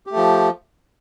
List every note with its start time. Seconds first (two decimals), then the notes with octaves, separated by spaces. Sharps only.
0.07 G4
0.11 A3
0.16 F3